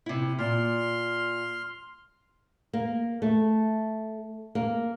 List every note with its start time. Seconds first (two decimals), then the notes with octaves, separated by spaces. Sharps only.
0.06 C3 E4
0.39 A#2 C6 F6
2.73 A#3
3.22 A3
4.55 A#3